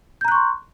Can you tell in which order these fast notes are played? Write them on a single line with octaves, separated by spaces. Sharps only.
G6 A#5 F#6 C#6 C6